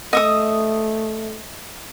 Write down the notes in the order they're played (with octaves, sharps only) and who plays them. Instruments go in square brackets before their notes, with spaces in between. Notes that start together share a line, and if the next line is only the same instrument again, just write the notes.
[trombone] A3 [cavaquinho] D#5 E5 D#6